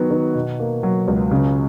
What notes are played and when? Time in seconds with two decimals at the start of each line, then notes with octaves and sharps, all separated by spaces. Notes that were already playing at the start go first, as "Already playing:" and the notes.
Already playing: D#3 F#3 B3
0.11 D#3
0.35 B2
0.59 A#3
0.83 F#3
1.08 C#2
1.31 C#3